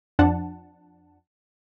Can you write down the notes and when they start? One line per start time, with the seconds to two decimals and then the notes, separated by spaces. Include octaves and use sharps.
0.19 F2 F3 D4 F#5 A5